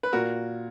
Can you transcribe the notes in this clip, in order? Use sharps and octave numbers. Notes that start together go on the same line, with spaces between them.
B4
A#2 F#4 A#4